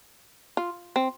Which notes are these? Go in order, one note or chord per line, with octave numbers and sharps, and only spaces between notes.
F4
C4